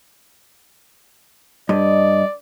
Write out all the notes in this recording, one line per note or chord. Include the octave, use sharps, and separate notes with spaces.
G2 D5 D#5